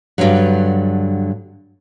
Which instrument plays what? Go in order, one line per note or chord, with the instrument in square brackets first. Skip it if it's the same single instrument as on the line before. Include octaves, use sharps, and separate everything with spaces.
[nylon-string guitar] G2 D3 E3 F#3